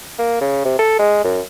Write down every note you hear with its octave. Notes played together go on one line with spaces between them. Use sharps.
A#3
C#3
C3
A4
G#3
F#2